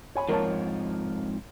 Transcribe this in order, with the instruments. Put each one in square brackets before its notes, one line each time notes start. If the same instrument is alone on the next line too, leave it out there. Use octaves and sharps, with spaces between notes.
[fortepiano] C#5 G#5 B5
[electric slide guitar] F2 G#2 F3 [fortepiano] A#4 C#5 A5